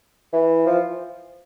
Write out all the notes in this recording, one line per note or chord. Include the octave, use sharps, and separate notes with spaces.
E3
F3